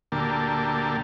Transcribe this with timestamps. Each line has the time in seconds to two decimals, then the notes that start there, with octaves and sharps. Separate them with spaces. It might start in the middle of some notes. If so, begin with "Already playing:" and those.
0.12 D2 A#2 D3 A#3 G4 A5